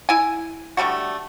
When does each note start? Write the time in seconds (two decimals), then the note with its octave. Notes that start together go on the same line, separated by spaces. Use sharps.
0.09 E4 G#5
0.77 D3 G3 A3 F#4